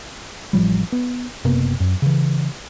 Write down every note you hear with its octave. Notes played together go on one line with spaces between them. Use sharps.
A1 F3 G3
B3
F#1 C3 A#3 B3
F#2
C#3 E3